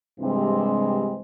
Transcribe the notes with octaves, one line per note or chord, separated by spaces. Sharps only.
G2 C3 E3 G#3 C4